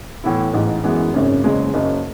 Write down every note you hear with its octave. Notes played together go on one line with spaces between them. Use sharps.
A2 E3 B3 E4
A1 G#2 E3
F#2 E3 G#3 B3
G#1 F#2 C#3
F#1 E2 C#3 G#3
F#1 F#2 C#3